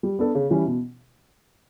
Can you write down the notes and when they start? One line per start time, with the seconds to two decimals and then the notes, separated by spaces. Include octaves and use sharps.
0.03 G3
0.19 B3 D4 A4
0.35 C#3
0.50 E3 G3 C#4 E4
0.66 B2